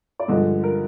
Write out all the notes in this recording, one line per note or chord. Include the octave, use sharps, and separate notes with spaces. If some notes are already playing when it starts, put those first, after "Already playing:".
D5
G2 D3 F3 G#3 D#5
A#4